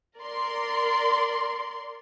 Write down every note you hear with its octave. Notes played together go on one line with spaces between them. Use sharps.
A#4 D5 C6